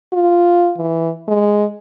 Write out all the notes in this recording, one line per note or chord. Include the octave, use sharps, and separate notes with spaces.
F4
E3
G#3